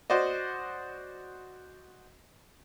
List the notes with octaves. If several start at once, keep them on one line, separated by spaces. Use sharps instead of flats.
F#4 C5 D5 D#5